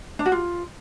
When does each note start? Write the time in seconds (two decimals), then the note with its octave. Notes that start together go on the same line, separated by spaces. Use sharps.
0.19 D4
0.26 F#4
0.32 F4